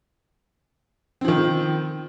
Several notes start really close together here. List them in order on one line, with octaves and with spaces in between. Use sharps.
C4 F3 D#3